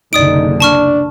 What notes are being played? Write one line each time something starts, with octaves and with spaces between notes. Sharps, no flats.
F#1 C2 D3 D#4 D5 D#6 D7
D4 A5 C#6 F6